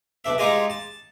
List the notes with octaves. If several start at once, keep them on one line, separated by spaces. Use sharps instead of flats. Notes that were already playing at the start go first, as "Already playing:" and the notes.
B1 D4 E5
G#3 D#4 F4 G4 G#4 D#5
A5